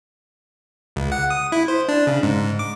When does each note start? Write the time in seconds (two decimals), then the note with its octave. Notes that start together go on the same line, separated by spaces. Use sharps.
0.96 C#2
1.12 F#5
1.30 D#6
1.52 E4
1.68 C5
1.88 D4
2.07 C#3
2.23 G#2
2.59 D6